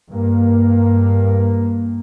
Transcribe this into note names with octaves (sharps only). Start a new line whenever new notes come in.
G2 A#3